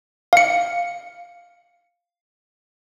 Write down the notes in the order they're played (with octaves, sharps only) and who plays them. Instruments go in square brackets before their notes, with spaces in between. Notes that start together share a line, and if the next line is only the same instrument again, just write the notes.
[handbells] F5 C#7